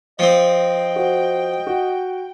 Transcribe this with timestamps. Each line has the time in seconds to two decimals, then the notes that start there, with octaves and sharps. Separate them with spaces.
0.19 F3 C4 D#5 G5
0.96 F#4 C5
1.67 F#4